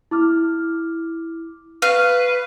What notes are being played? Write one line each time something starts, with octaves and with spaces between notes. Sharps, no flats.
E4 D6 F6
B4 F5 C#6